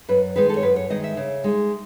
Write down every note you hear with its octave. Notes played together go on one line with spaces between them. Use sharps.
F#2 B4
D#3 G#3 D#4 B4
A4
C#5
F#2 B4
C#5
D#3 G#3 D#4 D#5
E5
C#3
G#3 D#4